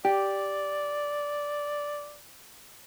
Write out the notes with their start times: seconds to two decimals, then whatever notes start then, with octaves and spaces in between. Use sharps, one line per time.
0.05 G4 D5